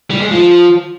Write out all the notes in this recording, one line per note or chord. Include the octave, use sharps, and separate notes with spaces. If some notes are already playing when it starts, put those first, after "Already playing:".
G3
G#3
F3